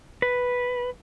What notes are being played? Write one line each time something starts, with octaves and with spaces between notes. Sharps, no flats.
B4